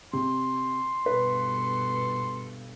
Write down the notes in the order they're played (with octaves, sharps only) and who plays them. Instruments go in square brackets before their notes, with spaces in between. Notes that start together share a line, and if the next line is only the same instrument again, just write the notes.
[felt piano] C3 [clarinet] C6
[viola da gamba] G2 B2 A4 [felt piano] B4